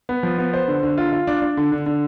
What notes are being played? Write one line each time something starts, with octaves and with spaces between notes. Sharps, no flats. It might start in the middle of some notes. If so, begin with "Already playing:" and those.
B3
F3
B3
C5
D3
D3
F4
F4
D4
D4
D3
D3
D3